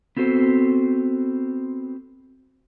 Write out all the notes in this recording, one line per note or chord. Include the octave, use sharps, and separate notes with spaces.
B3 C4 F#4 A4 C5